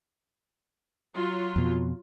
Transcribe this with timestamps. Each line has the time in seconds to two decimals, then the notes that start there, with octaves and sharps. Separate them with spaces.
1.14 F#3 F4
1.56 F2 B2